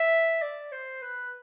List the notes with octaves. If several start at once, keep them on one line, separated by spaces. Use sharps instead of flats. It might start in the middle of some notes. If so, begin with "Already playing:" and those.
Already playing: E5
D5
C5
B4